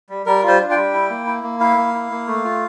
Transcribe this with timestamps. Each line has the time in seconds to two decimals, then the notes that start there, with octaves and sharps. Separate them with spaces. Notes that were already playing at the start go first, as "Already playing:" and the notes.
0.10 G3
0.26 G3 A#4
0.43 F4
0.48 C5
0.60 D4
0.71 G5
0.76 G3
0.93 E4
1.10 A#3
1.26 E4
1.43 A#3
1.60 E4 F5
1.77 A#3
1.94 E4
2.11 A#3
2.27 A3
2.44 F4